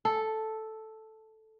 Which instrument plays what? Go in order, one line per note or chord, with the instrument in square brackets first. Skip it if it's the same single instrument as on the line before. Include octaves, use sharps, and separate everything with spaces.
[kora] A4